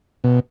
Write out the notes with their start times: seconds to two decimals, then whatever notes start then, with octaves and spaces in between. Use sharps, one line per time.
0.24 B2